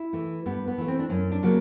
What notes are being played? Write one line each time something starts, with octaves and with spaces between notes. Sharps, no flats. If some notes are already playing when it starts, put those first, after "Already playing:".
Already playing: E4
E3 A3
G2 B3
B3
E3 A3
C4
D4
F#2 C#4
D4
C#3 F#3 A#3